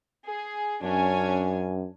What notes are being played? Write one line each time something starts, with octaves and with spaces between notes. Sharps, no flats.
G#4
F#2 C#4 D4 G#5